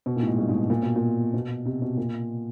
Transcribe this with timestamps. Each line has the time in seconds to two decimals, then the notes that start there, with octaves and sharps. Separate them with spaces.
0.06 B2
0.16 A#2
0.22 A2
0.27 G#2
0.38 G2
0.49 G#2
0.70 A#2
0.82 B2
0.96 A#2
1.34 B2
1.66 C3
1.82 B2
1.97 A#2